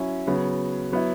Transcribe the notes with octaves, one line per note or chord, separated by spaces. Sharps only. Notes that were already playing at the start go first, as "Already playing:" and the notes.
Already playing: F#3 C#4 E4
C#3 F#3 B3
F#3 B3 E4